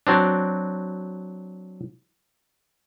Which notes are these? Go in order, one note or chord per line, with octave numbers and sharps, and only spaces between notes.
F#3 C4 D4